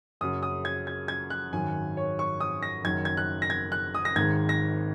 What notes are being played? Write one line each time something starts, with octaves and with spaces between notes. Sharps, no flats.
F#1 F#2 C#3 D#6
D#6
G#6
G#6
G#6
F#6
G#1 F#2 D#3 G#5
C#5
C#6
D#6
A#6
F#1 F#2 D#3 G#6
G#6
F#6
A#6
G#6
F#6
D#6
A#6
G#1 G#2 D#3 G#6
A#6